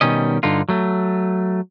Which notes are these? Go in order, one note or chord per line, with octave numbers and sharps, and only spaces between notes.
B2 D#3 G3 C#4 D#5
G2 D3 D#4 F4
F#3 A3